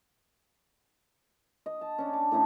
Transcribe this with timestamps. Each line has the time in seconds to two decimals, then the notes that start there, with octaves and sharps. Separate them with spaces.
1.66 D#5
1.81 A5
1.98 C#4 D4
2.13 D6
2.32 A2 A3 C#4 D#4